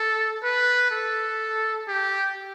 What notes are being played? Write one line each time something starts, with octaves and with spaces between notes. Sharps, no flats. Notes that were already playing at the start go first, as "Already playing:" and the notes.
Already playing: A4
B4
A4
G4